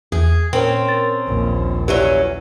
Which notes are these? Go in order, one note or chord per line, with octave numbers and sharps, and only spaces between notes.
E2 G#4
A#2 C4 C#4 A#4
A6
A#1 D#2
E3 F#3 C#4 G4 B4 D5